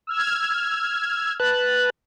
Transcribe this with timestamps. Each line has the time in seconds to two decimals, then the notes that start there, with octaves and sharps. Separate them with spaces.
0.07 E6 F6 G#6
1.40 B4 A5 F#6